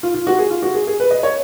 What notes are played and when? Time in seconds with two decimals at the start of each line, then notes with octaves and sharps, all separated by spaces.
0.03 F4
0.14 F4
0.27 F#4
0.38 G#4
0.51 F4
0.62 F#4
0.74 G#4
0.87 G#4
1.00 B4
1.11 D#5
1.23 C#5